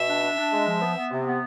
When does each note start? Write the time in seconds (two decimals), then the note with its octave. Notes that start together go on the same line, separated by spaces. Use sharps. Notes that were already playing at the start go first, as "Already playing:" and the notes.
Already playing: B2 E5
0.08 D4
0.23 D4
0.38 D4
0.52 G#3
0.67 F3
0.82 B3
0.96 B3
1.11 C3
1.26 B3